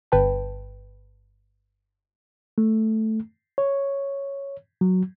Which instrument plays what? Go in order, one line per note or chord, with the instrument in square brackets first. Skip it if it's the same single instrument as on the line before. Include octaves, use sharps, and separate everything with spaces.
[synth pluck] G1 B4 G5 A5
[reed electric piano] A3
C#5
F#3